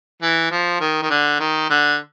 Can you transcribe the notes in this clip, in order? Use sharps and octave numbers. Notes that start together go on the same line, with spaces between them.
E3
F3
D#3
D#3
D3
D#3
D3